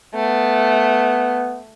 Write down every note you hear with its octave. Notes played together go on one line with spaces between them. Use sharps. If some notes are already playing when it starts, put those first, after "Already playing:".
A3 B3